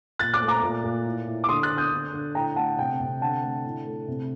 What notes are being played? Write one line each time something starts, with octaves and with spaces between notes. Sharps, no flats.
A#2 F#6 A6
D6 F#6
A3
A#5 D6
A#2
A#2
A2
A2
D6
D3 C6 D#6
F#6 A6
D3
D#6 G6
D3
D3
A2 G5 A#5
A3 F#5 A5
C3 G5
C3
D3 F#5 A5
A3
A2
A3
C3